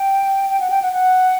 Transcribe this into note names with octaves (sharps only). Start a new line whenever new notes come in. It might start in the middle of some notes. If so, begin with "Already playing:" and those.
Already playing: G5
G5
F#5
G5
F#5
F#5